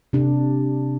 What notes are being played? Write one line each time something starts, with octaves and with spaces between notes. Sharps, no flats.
C3 D4